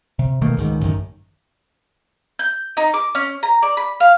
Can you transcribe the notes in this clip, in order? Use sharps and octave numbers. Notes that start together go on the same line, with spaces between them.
C3
B2 D#3 A3 A#3
C#2 G#2 D#3
A1 F#2 D#3
G6
D#4
D6
C#4
A#5
D5
B5
F5